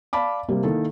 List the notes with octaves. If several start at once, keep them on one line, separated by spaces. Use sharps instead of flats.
D5 F5 A5 B5 D6
C3 G3 A#3
D#3 A#3 E4 A4